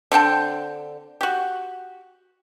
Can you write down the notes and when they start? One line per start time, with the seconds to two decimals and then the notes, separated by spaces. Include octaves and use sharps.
0.12 D3 C4 G5 A5
1.21 F#4 G4